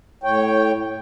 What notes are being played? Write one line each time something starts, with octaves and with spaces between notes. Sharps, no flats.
A2 C#5 G5